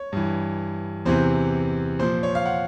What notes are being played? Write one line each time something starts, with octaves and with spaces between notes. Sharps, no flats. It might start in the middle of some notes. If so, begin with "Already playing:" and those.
Already playing: C#5
G2 E3
E2 C3 E3 C5
A#2 F3 C5
C#5
F5
F#5